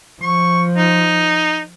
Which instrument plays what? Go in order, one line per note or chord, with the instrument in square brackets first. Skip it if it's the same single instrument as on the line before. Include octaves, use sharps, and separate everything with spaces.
[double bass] F3 [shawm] C#6
[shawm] D#4